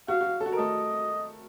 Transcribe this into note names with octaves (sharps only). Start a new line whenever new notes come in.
F#4 F5
F#4
A4
F#4
A#4
A3 A4 D#5